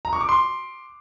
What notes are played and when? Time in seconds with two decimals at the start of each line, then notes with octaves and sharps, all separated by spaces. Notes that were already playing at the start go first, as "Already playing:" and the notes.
0.05 A#5
0.13 C#6
0.21 D6
0.29 C6